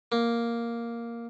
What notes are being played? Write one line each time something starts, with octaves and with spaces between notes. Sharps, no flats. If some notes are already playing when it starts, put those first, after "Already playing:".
A#3